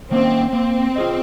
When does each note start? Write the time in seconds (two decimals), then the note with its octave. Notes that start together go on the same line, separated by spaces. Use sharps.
0.11 D#3 A#3 C4 C#4
0.53 A#3 C4
0.96 F4 G#4 D#5